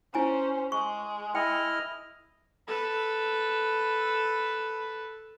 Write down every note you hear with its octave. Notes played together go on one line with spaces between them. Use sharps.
C#4 E4 C5 G#5 A#5
G#3 C#6
E4 D#5 G5 F6
A4 B4